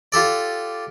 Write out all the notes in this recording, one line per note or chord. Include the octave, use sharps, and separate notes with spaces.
F4 G4 A4 D5